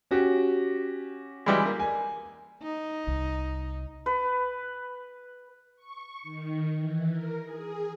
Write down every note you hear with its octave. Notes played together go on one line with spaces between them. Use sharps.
C#4 F#4 G4
E3 G3 G#3
A#3
G#5
D#4
C2
B4
C#6
D#3
E3
A#4
G#4